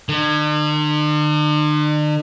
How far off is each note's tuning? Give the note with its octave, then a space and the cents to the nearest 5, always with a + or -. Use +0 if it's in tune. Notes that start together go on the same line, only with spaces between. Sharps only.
D3 +45